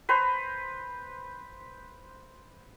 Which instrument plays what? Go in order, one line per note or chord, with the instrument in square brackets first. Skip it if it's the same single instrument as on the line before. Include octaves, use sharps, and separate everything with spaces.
[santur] B4 C5 A#5